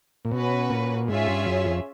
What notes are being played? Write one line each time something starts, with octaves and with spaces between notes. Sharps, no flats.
A#2
B2 C#4 F#4 B4
A#2
G#2 C#4 F4 G#4 C#5 E5
G2
F#2
F2